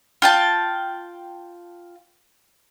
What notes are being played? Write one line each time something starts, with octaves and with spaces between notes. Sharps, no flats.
F4 G5 A5